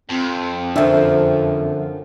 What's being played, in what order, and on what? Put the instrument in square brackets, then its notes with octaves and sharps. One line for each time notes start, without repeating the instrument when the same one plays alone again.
[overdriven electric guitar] F2 [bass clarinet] C4
[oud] F#2 F3 [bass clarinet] D3 [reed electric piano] D4 E5 G5